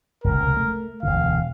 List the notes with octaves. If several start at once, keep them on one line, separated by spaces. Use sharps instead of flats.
F1 C#2 B2 A#4
A3
E1 D2 D3 F5